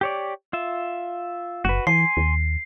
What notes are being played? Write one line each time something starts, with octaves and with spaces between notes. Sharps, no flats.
G4 C#5 D5
F4 E5
F#1 F#4 B4
E3 G#5 C6 C7
D#2